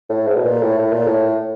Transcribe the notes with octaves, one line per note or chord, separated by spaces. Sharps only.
A2
G#2
B2
A#2
A2
A2
A#2
A2